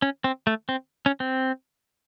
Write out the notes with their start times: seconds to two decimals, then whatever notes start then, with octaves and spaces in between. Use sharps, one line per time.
0.02 C#4
0.24 C4
0.47 A3
0.69 C4
1.06 C#4
1.20 C4